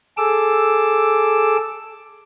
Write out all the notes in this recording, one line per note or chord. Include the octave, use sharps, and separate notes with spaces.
G#4 A4 D6 E6